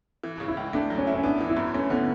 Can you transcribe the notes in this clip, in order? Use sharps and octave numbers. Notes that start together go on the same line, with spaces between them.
E3
C#3
E4
C#2
A3 D4
F#3
C#4
E4
C#4
B3 D4
E3
E4
F#2
A3 C#4
D3 B3